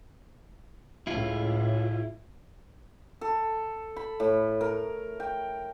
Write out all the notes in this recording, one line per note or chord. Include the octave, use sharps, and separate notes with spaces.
C#2 A2 E4 F4
A4
B5
A2
A#4
G5